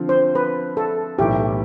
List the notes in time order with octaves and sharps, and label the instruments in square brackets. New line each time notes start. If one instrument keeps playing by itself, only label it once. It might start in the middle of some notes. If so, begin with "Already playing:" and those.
Already playing: [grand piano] D3 F3 C4 F4
[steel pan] C5
B4
A4
[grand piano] B1 A2 E3 A3 [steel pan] G4